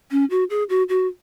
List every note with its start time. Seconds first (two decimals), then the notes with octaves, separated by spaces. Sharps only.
0.11 C#4
0.30 F#4
0.50 G#4
0.69 F#4
0.89 F#4